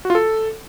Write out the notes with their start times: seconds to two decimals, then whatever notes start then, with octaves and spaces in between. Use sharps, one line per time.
0.05 F#4
0.10 F4
0.15 A4